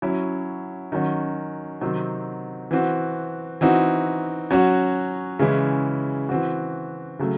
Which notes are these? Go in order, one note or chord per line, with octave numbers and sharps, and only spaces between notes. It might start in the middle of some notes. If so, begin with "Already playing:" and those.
F#3 C#4 E4
D#3 F#3 C#4 F#4
C3 D#3 F#3 C4
E3 C4 F#4
E3 C4 D#4 F#4
F#3 C#4 F#4
C#3 E3 G#3 C#4 E4
E3 C4 F#4
C#3 F#3 A3